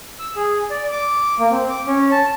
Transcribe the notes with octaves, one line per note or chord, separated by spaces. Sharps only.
E6
G#4
D5
D6
A#3
C4
D6
C#4
A5